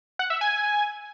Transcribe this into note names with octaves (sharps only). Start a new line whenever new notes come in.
F#5
E5
G#5